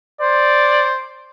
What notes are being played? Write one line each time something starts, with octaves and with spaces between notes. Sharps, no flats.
C5 D5